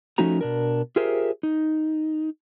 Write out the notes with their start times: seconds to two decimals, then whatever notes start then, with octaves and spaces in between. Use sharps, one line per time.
0.18 F3 A3 C#4 D#4 F#4 A#5
0.41 B2 D4 A#4
0.96 F4 G4 G#4 A#4 C5 E5
1.43 D#4